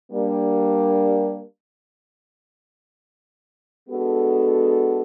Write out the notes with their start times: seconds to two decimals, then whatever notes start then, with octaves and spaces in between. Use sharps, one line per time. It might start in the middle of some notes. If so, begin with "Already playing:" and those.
0.11 G3 A#3 D4
3.88 G#3 B3 D4 F#4 A4